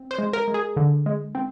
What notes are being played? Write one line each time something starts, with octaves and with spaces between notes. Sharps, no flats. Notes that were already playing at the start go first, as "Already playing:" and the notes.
Already playing: C4
C5
G#3
A#4
G#3
G#4
D3
G#3
C4